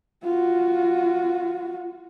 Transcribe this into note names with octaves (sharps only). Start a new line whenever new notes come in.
F4 F#4